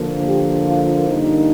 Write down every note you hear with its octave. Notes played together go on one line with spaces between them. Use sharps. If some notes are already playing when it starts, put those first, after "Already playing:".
Already playing: D3 F3 A#3
G4
F4
D3 G3 A#3 D4 D#4